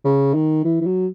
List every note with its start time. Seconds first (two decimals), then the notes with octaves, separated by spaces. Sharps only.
0.05 C#3
0.34 D#3
0.65 E3
0.81 E3
0.86 F#3